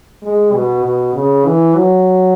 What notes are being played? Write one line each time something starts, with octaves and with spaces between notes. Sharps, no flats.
G#3
B2
B2
C#3
E3
F#3